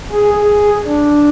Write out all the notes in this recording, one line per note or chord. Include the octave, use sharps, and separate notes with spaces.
G#4
G#4
D4